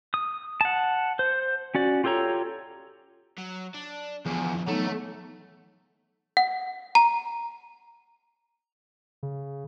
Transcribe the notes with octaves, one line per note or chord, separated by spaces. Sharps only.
D#6
F#5 A5
C5
C#4 F#4 D5
F4 G4 A4 C#5 A#5
F#3
D4
E2 D3 F3
D3 E3 F#3 A3 B3 D#4
F#5
A#5
C#3